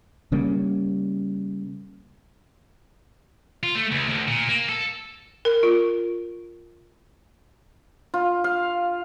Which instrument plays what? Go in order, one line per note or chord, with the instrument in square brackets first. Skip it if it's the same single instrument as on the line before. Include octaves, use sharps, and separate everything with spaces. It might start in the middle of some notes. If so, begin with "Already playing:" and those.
[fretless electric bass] C#3 G3 A#3 C#4
[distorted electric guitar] F4
A3
C#2
D2
A#2
A#3
A4
[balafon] A#4
F4
[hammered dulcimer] F4
F5